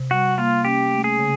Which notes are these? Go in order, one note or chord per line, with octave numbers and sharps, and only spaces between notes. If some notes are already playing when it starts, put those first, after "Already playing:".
Already playing: C3
G3 F#4
A#3 F4
C#4 G4
A3
G#4
C#3